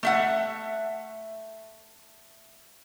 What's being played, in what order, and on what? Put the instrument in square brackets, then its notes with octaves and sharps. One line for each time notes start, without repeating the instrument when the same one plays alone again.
[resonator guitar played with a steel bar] A3 E5 F#5